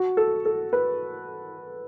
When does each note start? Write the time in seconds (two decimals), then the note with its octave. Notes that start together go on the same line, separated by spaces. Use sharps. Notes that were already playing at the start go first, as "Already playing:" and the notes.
Already playing: F#4
0.17 A4
0.45 A4
0.73 B4